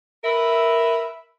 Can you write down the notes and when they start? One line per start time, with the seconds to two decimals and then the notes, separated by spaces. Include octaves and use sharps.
0.24 A#4 B4 E5